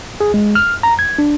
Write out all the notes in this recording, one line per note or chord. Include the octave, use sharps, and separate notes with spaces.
G#4
G#3
F6
A#5
G#6
D4